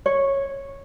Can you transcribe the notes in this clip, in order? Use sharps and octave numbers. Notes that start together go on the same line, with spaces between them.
C#5